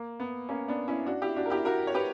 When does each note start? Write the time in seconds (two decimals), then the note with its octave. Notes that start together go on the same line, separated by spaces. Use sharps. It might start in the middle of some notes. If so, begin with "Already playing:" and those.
Already playing: A#3
0.20 B3
0.49 A#3 C#4
0.68 B3 D4
0.88 C#4 E4
1.06 D4 F#4
1.22 E4 G4
1.36 D4 F#4
1.46 A#4
1.50 E4 G4
1.65 F#4 A#4
1.87 C#5
1.94 G4 B4